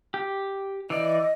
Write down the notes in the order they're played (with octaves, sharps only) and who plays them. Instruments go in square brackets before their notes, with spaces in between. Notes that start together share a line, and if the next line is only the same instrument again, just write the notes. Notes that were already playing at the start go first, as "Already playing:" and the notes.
[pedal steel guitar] G4
[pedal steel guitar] E3 D5 [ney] D#5